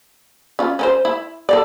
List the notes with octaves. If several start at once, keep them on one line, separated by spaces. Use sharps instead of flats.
C#4 F4
C#4 A#4 C5
E4
A4 A#4 D5